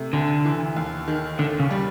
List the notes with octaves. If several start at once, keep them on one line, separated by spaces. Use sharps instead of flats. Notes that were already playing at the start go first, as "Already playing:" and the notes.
Already playing: C3 A3
D2 D3
E3
D#2
D#3
D#2 D3
C#3
G3